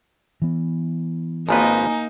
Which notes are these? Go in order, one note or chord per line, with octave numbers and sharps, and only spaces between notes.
E3 B3
G#1 F3 A#3 D#4 B4 G#5 A#5